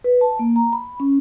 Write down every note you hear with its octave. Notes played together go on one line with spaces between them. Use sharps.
B4
A5
A#3
A#5
B5
C#4